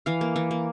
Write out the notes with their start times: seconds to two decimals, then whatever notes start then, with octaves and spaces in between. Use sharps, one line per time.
0.06 E3 F5
0.21 A#3
0.36 E3
0.51 A#3